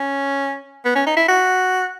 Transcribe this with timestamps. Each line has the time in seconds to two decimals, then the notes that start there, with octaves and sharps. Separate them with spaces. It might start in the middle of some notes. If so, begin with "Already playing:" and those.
Already playing: C#4
0.85 B3
0.96 C#4
1.07 D#4
1.17 E4
1.28 F#4